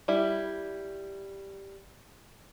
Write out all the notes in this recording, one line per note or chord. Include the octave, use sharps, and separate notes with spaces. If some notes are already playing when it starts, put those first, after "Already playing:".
G3 E4